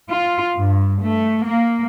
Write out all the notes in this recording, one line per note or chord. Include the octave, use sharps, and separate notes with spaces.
F4
G2
A3
A#3